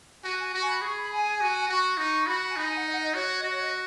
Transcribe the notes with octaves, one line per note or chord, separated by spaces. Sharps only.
F#4 G#5
G#5
F#4 C#6
G#5
B5
G#4 C#6
B5
G#5
F#4
F#4 C#6
D#4
F#4 B5
B5
G#5
D#4 B5
G#5
F#5
D#5
F#5
D#5
F#4 C#5
C#5
F#4 D#5
C#5
D#5